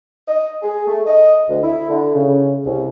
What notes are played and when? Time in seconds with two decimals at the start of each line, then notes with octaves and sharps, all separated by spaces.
0.28 D#5
0.62 G#4
0.87 A3
1.06 D#5
1.49 D2
1.63 E4
1.88 D3
2.14 C#3
2.65 C2